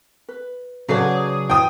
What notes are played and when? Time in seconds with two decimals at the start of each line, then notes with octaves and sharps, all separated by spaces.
0.29 B4
0.88 C#3 F#3 F#4 G#4 A4 B4 D5
1.50 E3 G5 D#6